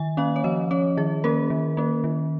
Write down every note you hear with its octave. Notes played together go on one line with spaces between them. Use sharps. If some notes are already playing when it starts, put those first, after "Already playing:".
Already playing: D#3 G#5
A#3 C#4 F5
C#5
F3 D#5
C#4 C#5
D#3 G#4
A#3 C#4 A#4
D#3
A#3 C#4
D#3